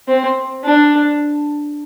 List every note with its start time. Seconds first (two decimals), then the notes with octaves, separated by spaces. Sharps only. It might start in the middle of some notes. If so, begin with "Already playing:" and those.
0.08 C4
0.64 D4